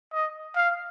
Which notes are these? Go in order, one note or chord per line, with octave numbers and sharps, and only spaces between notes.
D#5
F5